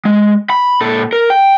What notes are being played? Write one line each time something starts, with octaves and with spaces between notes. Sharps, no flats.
G#3
B5
A#2 A4
A#4
G5